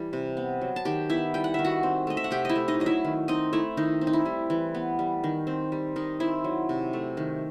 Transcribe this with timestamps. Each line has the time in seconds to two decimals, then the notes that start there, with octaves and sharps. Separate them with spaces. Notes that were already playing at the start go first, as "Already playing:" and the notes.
Already playing: E3 G3
0.13 C3
0.37 B3
0.61 F#3
0.76 A5
0.85 D#3 G4 G5
1.10 B3 E4 E5
1.34 G3 G5
1.44 F#5
1.54 D#3 E5
1.64 F#4 F#5
1.83 C4
2.07 A3 D#5
2.17 E5
2.24 F#5
2.31 C3 G4 G5
2.45 E4 D#5 E5
2.55 A3
2.68 D#4 D#5
2.80 F#3 D#5
2.86 E4 E5
3.04 D#3
3.28 C4 D#4 D#5
3.53 A3 E4
3.77 D#3 D#4
4.01 C4
4.07 D#4
4.13 E4
4.25 G3
4.50 E3
4.75 B3
4.99 G3
5.24 D#3
5.47 C4
5.72 G3
5.96 D#3 D#4
6.20 C4 E4
6.44 F#3
6.69 C3
6.93 A3
7.17 D#3